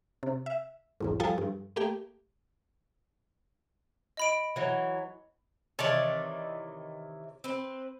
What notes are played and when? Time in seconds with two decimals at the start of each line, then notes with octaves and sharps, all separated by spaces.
0.23 C3
0.46 E5
1.00 B1 E2 G#2
1.20 F3 G3 A4 G#5 A6
1.38 G2
1.76 A3 A#3 G4 G5
4.17 D#5 B5 D7
4.56 E3 F#3
5.79 C3 D#3 E3 C#5 D5 A5
7.44 C4 B4